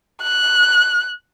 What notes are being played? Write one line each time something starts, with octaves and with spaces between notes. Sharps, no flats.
F#6